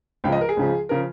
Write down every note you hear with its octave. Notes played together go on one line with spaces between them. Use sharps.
C#2 C#3 F3 G5
D#5
A#4
G#4
C#2 C#3 F3
C#3 F3 A#4